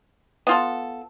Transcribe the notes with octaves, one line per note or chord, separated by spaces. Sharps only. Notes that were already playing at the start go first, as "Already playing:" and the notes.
B3 F4 A4